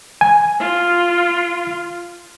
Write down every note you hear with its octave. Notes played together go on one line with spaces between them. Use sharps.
G#5
F4